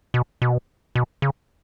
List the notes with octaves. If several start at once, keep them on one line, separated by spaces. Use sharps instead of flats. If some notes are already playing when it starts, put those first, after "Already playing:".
B2
B2
B2
C#3